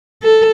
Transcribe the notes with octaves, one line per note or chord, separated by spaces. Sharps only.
A4